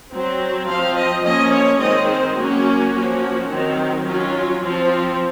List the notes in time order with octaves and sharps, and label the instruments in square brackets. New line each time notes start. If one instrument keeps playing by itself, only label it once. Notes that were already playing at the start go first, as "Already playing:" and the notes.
[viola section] F#3 C4
F3 C4 F5
D#5
F3 A#3 C#4 D#5
C#5
D#3 G#3 C4 D#5
C5
F#3 A#3 C#4 F#4
F3 A#3 C#4
D#3 F#3 C4
F#3 C#4 F4
F3 C4 F4